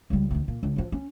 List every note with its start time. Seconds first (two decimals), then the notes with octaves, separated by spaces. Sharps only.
0.10 C#2 G3
0.31 D2 D#3
0.48 A#2
0.63 C#2
0.76 F3 F#3
0.92 C#4